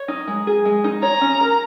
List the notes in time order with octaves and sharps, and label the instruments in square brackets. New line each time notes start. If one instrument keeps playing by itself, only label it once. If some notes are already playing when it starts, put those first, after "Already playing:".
Already playing: [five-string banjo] C#5
D#4
G#3
G#4
G#3
D#4
[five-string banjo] C#5 [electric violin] A#5
[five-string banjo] C#4
A#4